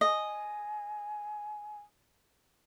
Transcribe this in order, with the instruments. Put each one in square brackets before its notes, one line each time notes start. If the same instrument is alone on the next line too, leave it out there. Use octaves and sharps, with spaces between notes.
[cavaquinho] D#5 [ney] G#5